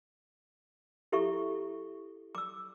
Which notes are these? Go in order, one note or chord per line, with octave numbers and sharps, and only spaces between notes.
E4 G4 A4 E5 C#6
D6 E6